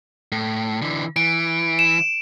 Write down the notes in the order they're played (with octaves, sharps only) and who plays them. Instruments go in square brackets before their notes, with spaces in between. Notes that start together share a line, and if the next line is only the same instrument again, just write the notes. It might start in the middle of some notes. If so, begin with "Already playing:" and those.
[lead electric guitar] A2
D3 E3
[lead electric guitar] E3 [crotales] D7
[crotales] E7